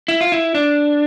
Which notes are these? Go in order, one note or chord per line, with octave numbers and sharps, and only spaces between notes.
E4
F4
E4
D4